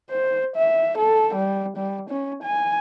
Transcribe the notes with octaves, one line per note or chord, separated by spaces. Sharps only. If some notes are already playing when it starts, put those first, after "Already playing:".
C5
E5
A4
G3
G3
C#4
G#5